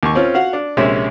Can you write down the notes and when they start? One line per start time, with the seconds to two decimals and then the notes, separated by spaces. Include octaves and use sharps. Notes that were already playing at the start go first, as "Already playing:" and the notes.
0.03 D#2 C#6
0.15 C4 C#4 F4
0.34 F#4 F5 F#5
0.53 D4
0.77 A#1 C3 G#3 C#4 E5